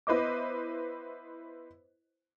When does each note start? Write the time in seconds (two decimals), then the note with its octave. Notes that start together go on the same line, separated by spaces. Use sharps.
0.07 B3 E4 B4 C5 D#5 D6